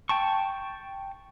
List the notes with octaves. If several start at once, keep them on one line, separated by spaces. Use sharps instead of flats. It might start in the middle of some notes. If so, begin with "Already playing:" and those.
G5 A5 C#6